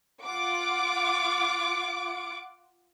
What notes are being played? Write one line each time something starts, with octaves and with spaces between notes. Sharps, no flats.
F4 F#5 D6 D7